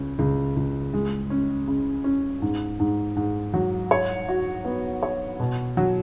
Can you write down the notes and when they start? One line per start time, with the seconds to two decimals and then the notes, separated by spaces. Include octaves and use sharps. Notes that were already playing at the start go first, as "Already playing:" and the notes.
Already playing: C#2 C#4
0.19 C#2
0.56 C#2
0.94 G#3
1.30 C#4
1.68 C#3
2.04 C#4
2.42 G#2
2.80 G#2
3.16 G#2
3.54 F#3
3.91 C#5
4.29 F#4
4.65 B3
5.03 C#5
5.40 B2
5.77 F#3